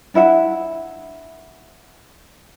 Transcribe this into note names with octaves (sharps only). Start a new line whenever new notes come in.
D4 E4 E5 F#5